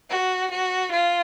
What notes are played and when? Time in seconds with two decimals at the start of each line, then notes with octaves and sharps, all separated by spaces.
0.10 F#4
0.51 F#4
0.93 F4